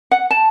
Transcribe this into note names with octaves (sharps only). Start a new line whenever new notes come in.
F#5
A5